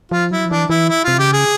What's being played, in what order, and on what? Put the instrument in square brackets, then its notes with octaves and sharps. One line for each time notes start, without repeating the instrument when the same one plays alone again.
[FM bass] F3 [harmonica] F4
[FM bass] F#3 [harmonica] E4
[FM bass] F3
[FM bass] E3 [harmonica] D4
[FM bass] E3 [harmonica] E4
[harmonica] E4
[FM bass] C3 [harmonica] F4
[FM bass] C#3 [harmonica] G4
[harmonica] G#4